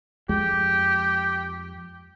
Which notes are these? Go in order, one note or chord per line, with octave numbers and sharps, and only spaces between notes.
F2 G#3 G4